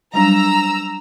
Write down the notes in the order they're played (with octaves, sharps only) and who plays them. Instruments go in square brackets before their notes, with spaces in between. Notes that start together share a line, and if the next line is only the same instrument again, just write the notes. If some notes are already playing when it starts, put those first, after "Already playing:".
[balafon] F#3 G3 D4 [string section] A#5 E6